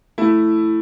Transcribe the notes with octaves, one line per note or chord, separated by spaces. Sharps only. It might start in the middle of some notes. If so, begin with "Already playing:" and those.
A3 E4